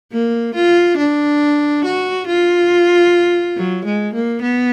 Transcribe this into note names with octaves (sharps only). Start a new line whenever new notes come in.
A#3
F4
D4
F#4
F4
F#3
G#3
A#3
B3